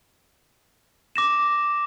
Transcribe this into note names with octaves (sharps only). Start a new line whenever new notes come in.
D6 A#6 E7